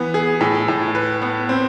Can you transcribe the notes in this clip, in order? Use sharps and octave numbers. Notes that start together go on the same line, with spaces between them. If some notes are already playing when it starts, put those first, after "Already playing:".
Already playing: E3 B3
G#4
A2
A2
B4
B3
C4